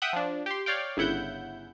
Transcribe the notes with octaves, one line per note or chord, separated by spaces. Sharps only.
E5 F#5 G5 D#6 F#6
F3 D4
G4 C6
C#5 D5 F5 G5
G1 C#3 E4 F#5 G6